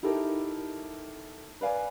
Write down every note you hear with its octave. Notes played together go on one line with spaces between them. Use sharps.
D#4 E4 G4 A4 A#4
B4 D5 F5 G#5